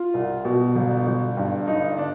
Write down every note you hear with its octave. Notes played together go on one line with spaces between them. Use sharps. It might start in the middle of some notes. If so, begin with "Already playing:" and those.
Already playing: F4
C2
B2
G1
G1
G2
G1 D#4
D4